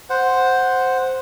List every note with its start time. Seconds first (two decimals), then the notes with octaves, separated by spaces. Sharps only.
0.10 C5 F#5